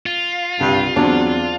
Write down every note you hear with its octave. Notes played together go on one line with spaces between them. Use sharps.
F4
C2 G2
E2 F#3 C4 D4